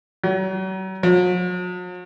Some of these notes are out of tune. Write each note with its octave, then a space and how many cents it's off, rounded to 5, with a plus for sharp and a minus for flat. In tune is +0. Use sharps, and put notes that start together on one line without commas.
F#3 +40
F#3 -45